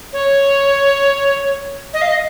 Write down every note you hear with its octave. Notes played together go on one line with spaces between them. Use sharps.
C#5
D#5
F5
D#5